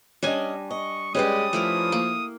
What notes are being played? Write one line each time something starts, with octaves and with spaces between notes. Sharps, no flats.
G3 C#4 D4 C#5 D#5 G#5
D#5 C#6
G3 G#3 C#4 G4 B4 D5 D#6
F3 A3 E4 A#4
A#3